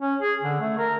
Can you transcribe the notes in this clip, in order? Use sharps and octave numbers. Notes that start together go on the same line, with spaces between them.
C#4
G#4
D3
A3
A#4